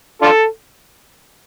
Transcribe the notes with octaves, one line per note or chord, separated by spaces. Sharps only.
D4 F4 A4